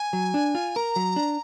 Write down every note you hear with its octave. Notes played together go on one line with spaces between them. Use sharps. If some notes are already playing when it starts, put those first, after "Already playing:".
Already playing: G#5
F#3
D4
F4
A#4 A#5
F#3
D4